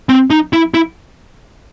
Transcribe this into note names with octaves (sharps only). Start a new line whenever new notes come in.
C4
D#4
E4
E4